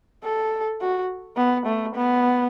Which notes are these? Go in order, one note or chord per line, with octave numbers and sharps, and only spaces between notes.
A4
F#4
B3
A3
B3